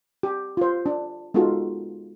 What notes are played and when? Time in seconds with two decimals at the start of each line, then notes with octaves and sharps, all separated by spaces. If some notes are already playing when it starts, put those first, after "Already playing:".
0.23 G4
0.57 F4 C5
0.86 D4
1.34 G#3 B3 D#4 F4 F#4 A4